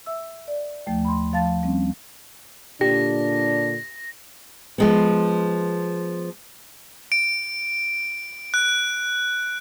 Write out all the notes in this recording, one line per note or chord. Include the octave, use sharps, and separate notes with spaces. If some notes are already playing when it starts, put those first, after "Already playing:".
E5 E6
D5
D#2 F3 A3 G5
B5 C6
F3 F5 A5 A6
G3 C4 C#4
A#2 D3 D4 G4 A#6
F3 G#3 B3
D7
F#6